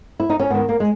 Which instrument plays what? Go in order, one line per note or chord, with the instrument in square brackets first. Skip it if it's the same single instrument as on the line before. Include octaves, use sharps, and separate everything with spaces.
[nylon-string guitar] E4
D#4
C#4
G#2 D#3 B3
A#3
G#3